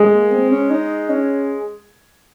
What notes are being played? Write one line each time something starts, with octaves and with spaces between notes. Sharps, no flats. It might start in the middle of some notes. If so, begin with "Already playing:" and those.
Already playing: G#3
A#3
C4
C#4
D#4
C#4